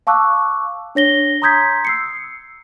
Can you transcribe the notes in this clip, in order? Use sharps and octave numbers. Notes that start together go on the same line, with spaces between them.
F5 A5 C#6 D6 E6 F#6
D4 C#5 A#6 G7
A#5 C6 D#6 G6 G#6 B6
E6 C7 C#7